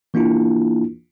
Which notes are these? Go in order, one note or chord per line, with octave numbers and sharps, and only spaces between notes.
E3 A#3 D4 E4 F4